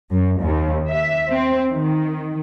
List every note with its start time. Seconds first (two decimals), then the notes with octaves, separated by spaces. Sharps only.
0.11 F#2
0.41 D#2
0.90 E5
1.30 C4
1.72 D#3